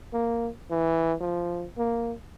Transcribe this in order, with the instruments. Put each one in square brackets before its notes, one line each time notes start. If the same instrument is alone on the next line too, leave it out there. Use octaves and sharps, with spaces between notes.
[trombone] A#3
E3
F3
A#3